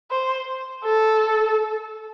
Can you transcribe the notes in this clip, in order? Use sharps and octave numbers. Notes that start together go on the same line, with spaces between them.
C5
A4